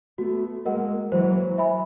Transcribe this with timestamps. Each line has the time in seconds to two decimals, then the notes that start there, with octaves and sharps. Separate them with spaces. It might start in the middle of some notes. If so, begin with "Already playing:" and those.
0.18 A3 B3 F#4
0.65 G#3 A#3 A#4 D#5 F#5
1.11 E3 F#3 C5
1.58 E5 G#5 B5